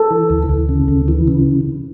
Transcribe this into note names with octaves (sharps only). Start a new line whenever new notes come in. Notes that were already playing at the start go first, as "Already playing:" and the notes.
Already playing: A4
E3
D2
D2
C#3
D2
E3
C#3